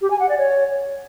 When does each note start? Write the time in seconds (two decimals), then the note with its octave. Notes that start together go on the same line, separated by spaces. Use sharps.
0.01 G4
0.10 G#5
0.19 F#5
0.29 D5
0.38 C#5